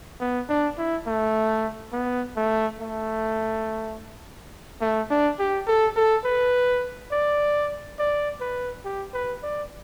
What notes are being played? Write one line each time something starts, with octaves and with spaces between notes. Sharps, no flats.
B3
D4
E4
A3
B3
A3
A3
A3
D4
G4
A4
A4
B4
D5
D5
B4
G4
B4
D5